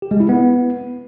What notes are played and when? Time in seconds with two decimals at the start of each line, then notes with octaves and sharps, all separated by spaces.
0.02 G4
0.11 G#3
0.20 E4
0.29 B3